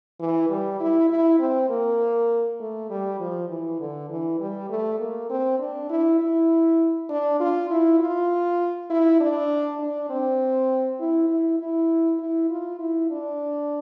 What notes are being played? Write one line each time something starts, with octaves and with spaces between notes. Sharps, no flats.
E3
G3
E4
E4
C4
A#3
A3
G3
F3
E3
D3
E3
G3
A3
A#3
C4
D4
E4
E4
D4
F4
E4
F4
E4
D4
D4
C4
E4
E4
E4
E4
F4
E4
D4